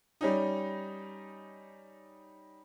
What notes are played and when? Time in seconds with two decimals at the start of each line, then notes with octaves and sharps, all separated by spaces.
0.21 G3 C#4 D#4